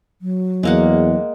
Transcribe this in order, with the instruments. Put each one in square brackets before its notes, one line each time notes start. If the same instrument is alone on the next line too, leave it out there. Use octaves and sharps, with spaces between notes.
[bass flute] F#3
[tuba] E2 [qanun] G#3 A#3 F#5